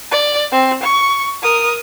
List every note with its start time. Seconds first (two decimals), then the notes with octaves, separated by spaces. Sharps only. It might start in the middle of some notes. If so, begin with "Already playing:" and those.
0.11 D5
0.52 C4
0.83 C#6
1.43 A#4 D#6